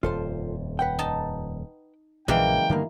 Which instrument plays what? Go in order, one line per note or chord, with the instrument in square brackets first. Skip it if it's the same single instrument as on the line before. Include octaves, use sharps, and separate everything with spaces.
[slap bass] D#1 F2 [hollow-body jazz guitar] F4 A4 C5
[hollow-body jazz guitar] B4 F#5 G5
[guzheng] D#4 A5
[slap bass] A#1 G2 [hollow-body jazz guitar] C#3 F#3 G#3 [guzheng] E3 A#3 [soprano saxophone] G5
[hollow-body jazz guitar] G2 D#3 A#3 [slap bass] D3 G3 A3